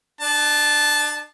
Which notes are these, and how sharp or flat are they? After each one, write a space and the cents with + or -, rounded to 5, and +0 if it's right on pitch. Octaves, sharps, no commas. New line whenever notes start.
D4 +35 A5 -10